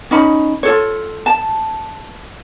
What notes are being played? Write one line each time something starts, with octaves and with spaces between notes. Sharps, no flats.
C#4 D#4 B5
F4 A4 C#5
A5